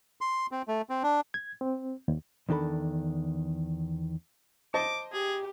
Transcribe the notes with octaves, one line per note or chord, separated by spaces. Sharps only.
C6
C4
A3
C4
D4
G#6
C4
D#2
E2 D#3 D4 A4 B5
C5 D#5 A5 D6
G4 G#4